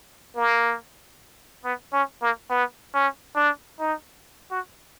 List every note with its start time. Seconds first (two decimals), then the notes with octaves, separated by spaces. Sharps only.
0.37 A#3
1.65 B3
1.93 C#4
2.22 A#3
2.51 B3
2.94 C#4
3.36 D4
3.80 D#4
4.51 F#4